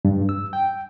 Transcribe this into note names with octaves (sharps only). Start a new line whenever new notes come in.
G2
E6
G5